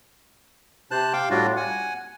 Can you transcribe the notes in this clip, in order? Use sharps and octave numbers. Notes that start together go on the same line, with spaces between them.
C3 C5 A5 F#6
F5 G5 D6
A2 G3 D4 F4 F#4
F#5 G#5